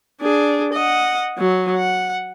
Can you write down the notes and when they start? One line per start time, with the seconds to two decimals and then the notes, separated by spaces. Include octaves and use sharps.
0.21 D4 G#4
0.73 D#5 F#5
1.38 F#3
1.76 F#5